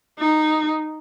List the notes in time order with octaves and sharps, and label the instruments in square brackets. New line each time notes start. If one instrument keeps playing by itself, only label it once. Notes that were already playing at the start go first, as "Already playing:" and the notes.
[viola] D#4